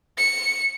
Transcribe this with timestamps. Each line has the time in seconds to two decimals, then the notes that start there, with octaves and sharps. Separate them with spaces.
0.18 C#7